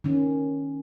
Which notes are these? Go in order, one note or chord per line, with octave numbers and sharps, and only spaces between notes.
D#3 C#4